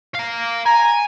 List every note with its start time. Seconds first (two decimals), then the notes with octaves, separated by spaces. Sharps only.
0.15 F5 A#5
0.66 G#5 A#5